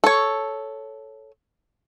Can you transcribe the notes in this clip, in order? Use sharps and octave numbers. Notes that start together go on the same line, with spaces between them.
A4 C#5